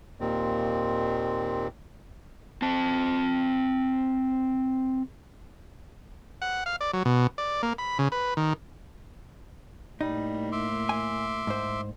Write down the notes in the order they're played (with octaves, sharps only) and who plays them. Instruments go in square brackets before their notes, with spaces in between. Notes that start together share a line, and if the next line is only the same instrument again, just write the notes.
[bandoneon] D#2 A#2 D#3 C4
[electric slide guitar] C4 A5
[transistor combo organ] F#5
F5
D5
F#3
B2
D5
A#3
B5
C#3
B4
D#3
[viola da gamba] A2 A#3 [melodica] G3 [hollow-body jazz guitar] D#4
[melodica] E5 C6 D6
[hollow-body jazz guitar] G#5
G#2 C5